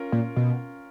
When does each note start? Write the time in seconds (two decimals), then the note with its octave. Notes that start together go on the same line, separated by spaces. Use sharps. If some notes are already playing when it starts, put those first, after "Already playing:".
Already playing: C#4 F4 A#4
0.12 A#2
0.36 B2